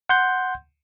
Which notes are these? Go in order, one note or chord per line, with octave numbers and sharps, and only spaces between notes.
F#5 C6 G6